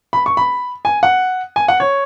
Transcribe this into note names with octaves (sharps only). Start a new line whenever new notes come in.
B5
C#6
B5
G#5
F#5
G#5
F#5
C#5